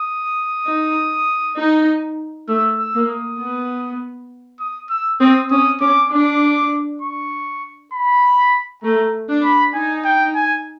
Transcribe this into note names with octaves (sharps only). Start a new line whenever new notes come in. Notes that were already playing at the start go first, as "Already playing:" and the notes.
Already playing: D#6
D#4
D#4
A3 E6
E6
A#3
D#6
B3
D#6
E6
C4 D#6
C#4 D#6
C#4 D6
D4 D6
C#6
B5
A3 A#5
D4
B5
D#4 G#5
G5
G#5